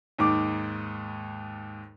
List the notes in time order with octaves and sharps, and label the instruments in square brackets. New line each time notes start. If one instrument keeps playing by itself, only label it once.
[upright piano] D#2 G#2 D6